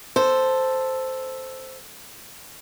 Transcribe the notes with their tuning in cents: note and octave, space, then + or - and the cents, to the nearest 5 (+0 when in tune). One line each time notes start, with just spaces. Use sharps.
A4 +0 C5 -5